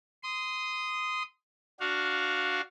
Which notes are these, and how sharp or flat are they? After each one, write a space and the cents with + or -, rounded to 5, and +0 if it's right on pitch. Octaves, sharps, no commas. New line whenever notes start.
C6 -20 D#6 +0
D4 +0 F#4 +0 F5 +5